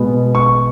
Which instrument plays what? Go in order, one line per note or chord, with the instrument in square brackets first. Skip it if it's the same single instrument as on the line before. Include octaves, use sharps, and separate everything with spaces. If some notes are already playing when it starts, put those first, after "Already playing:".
Already playing: [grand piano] B2 G#3 B3
C#6